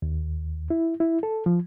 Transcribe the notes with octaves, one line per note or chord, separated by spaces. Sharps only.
D#2
E4
E4
A4
F3